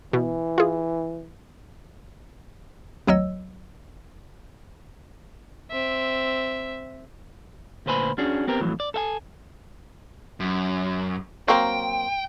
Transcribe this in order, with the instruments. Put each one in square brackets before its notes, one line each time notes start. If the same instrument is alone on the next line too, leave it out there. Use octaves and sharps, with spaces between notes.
[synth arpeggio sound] B2 [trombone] E3
[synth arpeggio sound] F4 G#4
G#1 D2 F#3 C#5 D#5 E6
[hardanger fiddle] C4 E5
[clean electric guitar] D2 A#2 B4 C5 G#5 B5
C#4 D4 F#4 G#4
B3 C4 G4 A#4
F2 A2 E3 F#3
D5
A4 E5 G#5
[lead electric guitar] F#2
[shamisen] F#3 A#3 C4 [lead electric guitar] G5